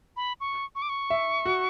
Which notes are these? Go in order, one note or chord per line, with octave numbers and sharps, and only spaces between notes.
B5
C#6
C#6
D6
C#6
E5
F#4